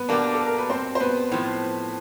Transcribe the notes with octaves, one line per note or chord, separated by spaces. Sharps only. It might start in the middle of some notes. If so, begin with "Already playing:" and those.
Already playing: B3 B4
B2 G3 A#3 D4
A4
A#4
B4
C4 C5
C5
B3 B4
A2 F3 A3